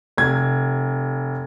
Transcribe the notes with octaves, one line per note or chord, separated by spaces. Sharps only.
F1 G#6